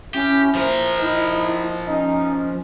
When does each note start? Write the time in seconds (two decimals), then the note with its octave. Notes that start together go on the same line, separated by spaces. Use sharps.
0.14 C#4 E4 G4
0.55 F3 A#4 C5
1.01 D#4 E4
1.88 C#4 D#4